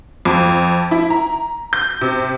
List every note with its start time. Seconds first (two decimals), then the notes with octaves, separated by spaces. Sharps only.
0.25 F2
0.91 E4
1.10 A#5
1.73 G6
2.01 C3